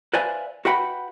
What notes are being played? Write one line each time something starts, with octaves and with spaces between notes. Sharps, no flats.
B4 C5 D5 E5 F5 G#5
F#4 B4 E5 F#5 G5 B5